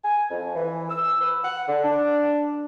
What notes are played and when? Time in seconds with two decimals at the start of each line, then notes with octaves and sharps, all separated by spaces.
0.04 G#5
0.30 F2
0.55 E3
0.89 E6
1.20 B4
1.44 F#5
1.68 D3
1.83 D4